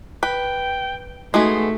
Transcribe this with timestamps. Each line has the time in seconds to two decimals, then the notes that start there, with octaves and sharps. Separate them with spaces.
0.23 B4 G5
1.34 G#3 A3 B3 D#4 F#4 G#4 C6